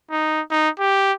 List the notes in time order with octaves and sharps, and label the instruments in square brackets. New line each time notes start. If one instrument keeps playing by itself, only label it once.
[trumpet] D#4
D#4
G4